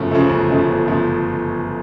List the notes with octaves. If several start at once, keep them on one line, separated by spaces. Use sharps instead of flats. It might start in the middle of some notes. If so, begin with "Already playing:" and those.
Already playing: G1 F#2 C#3 F3 A3
F#2 C#3 F3 A3
G1
F#2 C#3 F3 A3
G1
C#3 F3 A3